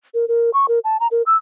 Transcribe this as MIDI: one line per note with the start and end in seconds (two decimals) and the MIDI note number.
0.14 0.25 70
0.28 0.50 70
0.54 0.66 85
0.68 0.79 70
0.84 0.97 81
1.00 1.07 82
1.11 1.22 70
1.26 1.37 88